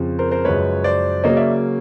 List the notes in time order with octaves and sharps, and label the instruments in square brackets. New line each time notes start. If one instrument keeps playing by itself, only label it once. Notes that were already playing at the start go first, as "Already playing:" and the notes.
Already playing: [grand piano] F2 C#3 F3
A#4 C5
A#4 C5
F#2 C#3 F3 G#3 B4 C#5
C5 D5
C#3 F#3 A#3 C#4 C#5 D#5
D5 E5